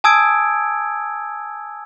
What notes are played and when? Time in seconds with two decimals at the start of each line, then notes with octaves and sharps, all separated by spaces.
0.04 G#5 A5 D#6 E6 G#6 D7